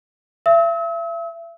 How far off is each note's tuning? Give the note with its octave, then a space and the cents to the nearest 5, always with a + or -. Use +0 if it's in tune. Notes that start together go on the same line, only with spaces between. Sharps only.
E5 +35 E6 -45